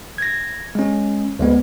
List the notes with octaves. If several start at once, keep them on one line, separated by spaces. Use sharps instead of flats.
G#6 A#6
G#3 C#4
D2 G#3 B3